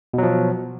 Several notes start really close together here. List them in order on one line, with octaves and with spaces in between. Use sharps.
B2 F#3 F3